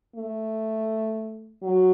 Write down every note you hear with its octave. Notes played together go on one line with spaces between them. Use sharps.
A3
F#3